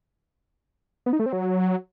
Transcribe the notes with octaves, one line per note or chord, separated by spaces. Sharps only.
B3
D#4
A3
C4
F#3